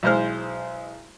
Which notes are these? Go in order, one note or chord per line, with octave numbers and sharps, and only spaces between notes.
B1 E3 G#3 C5 F6